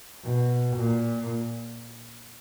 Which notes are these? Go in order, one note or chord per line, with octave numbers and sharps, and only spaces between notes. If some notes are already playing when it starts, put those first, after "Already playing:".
B2
A#2